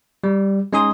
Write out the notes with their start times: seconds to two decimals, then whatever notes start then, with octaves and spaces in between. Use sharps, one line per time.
0.24 G3
0.73 G#3 C#4 D#4 G#4 C6 D#6